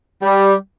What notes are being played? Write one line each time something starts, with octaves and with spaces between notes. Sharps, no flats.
G3